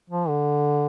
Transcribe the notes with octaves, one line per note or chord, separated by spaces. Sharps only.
F3
D3